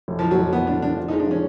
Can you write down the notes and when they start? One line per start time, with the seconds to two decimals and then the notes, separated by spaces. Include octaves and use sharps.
0.08 F1
0.19 F1 F3
0.31 F#3
0.38 F1
0.53 F1 B3
0.67 F1 D4
0.82 F1 D4
0.97 F3
1.08 G#3 D#4
1.20 D4
1.27 F3 C#4